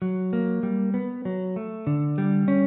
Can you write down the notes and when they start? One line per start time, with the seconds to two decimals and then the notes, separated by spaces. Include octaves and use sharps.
0.02 F#3
0.33 A#3
0.63 G3
0.94 B3
1.25 F#3
1.56 A3
1.87 D3
2.18 G3
2.48 C#4